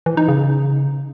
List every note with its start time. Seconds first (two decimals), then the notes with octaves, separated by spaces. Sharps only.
0.06 E3
0.17 D#4
0.28 C#3